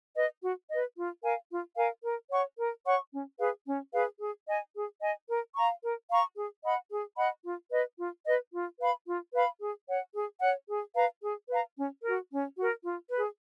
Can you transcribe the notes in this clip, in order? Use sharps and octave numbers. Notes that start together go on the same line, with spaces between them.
B4 D#5
F#4
B4 D#5
F4
A#4 F5 G#5
F4
A#4 F5 G#5
A#4
C#5 F#5 C#6
A#4
C#5 F#5 C#6
C#4
G#4 B4 F5
C#4
G#4 B4 F5
G#4
D#5 G#5
G#4
D#5 G#5
A#4
F5 A#5 C#6
A#4
F5 A#5 C#6
G#4
D#5 F#5 B5
G#4
D#5 F#5 B5
F4
B4 D#5
F4
B4 D#5
F4
B4 F5 B5
F4
B4 F5 B5
G#4
C#5 F#5
G#4
C#5 F#5
G#4
B4 F5 A#5
G#4
B4 F5 A#5
C#4
F#4 A#4
C#4
F#4 A#4
F4
G#4 B4